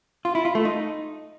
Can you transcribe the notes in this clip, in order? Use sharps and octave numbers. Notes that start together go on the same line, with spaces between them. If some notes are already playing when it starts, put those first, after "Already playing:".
F4
E4
F4
A3
D#4